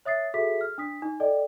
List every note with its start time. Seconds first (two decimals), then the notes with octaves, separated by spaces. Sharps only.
0.05 C#5 E5 D#6 A6 C7
0.34 F#4 G#4 A4 E5 B6
0.61 F6
0.78 D4 D#6 B6
1.02 D#4
1.20 A4 D5 D#5 G5